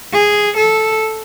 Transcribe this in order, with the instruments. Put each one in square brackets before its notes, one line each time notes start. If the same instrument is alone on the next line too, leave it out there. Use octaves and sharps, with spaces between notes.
[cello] G#4
A4